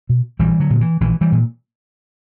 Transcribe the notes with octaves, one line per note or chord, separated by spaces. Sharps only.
B2
A#1 E3 G3
D3 F#3
A#2
E3
A#1 E3
E3 G3
A#2